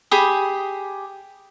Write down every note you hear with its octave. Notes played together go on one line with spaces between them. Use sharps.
G4 G#4 B5 D#6